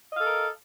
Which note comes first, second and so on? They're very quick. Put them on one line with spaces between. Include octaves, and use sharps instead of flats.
D#5 F5 A4 A#4